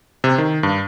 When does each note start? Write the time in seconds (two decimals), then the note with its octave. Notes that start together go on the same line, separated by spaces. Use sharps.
0.24 C3
0.38 D#3
0.63 G2